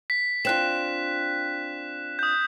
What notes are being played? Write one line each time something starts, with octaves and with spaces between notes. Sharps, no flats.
B6
C4 D4 F4 F#6 E7
D#6 G6